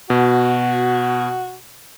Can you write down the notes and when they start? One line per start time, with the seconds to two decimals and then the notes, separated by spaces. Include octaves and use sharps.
0.10 B2 F#4